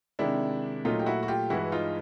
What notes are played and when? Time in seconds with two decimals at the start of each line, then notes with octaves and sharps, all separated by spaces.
0.19 C3 D#3 G#3 D4 E4
0.85 A#2 F#3 A3 D#4 F4
0.99 G4
1.06 E4 F#4
1.23 F#4
1.28 F4 G4
1.50 G2 E3 G#3 E4 F#4
1.72 D#4 F4